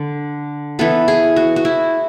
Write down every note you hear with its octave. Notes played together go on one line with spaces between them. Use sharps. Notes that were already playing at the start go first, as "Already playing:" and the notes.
Already playing: D3
E3 B3 A4
G#4
F#4
F#4
E4